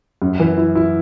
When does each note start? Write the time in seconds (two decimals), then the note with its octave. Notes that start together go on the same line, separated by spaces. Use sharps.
0.22 F#2
0.40 E3
0.57 E4
0.75 E4